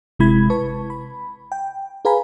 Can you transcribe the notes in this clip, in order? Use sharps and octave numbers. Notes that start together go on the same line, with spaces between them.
G1 C3 G#3 E4 B5 G#6
B4 A5 C#6
B5
G5
G#4 B4 F5 G#5 A#5 B5